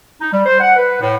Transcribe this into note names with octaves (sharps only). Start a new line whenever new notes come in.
D#4
G3
C5
F#5
B4
A2